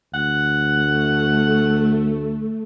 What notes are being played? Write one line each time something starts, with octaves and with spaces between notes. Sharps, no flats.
D2 F#5
A3